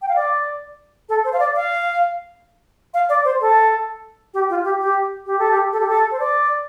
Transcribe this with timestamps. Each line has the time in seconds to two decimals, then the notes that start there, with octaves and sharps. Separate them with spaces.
0.02 G5
0.08 F5
0.16 D5
1.09 A4
1.24 C5
1.33 F5
1.39 D5
1.55 F5
2.94 F5
3.09 D5
3.24 C5
3.41 A4
4.34 G4
4.50 F4
4.64 G4
4.80 G4
5.26 G4
5.39 A4
5.51 G4
5.72 A4
5.80 G4
5.88 A4
6.11 C5
6.19 D5